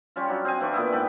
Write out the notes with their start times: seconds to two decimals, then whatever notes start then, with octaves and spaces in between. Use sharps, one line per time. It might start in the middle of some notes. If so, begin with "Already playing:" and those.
0.16 G3 C#4 F4
0.28 F#3 D4
0.45 C4 G#4 F5 G#5
0.60 E3 C4 D4 C#6
0.74 A#2 B3 E4
0.92 G#2 A4 B4 G5